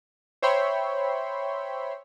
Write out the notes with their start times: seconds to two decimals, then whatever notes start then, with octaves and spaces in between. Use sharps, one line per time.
0.42 C5 C#5 E5 G5 B5 C6